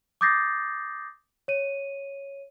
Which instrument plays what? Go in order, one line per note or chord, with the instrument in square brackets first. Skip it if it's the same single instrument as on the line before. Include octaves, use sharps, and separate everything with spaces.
[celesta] D6 D#6 G6 A6 A#6 C7
C#5 D#7